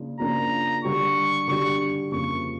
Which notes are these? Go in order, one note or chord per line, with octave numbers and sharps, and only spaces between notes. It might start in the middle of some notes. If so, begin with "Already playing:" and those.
Already playing: C#3 F3 A#3 D4 F4
C#3 F3 A#3 D4 F4 A#5
D3 G3 D4 G4 C#6
D3 G3 D4 G4 C#6
F2 C#3 F3 A#3 C#6